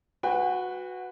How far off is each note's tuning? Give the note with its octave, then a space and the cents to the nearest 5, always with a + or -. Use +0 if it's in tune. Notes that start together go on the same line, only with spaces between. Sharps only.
F#4 -15 B4 +10 G5 +35